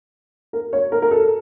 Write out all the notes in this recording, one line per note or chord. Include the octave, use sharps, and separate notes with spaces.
A#4
C#5
A#4
A#4
A4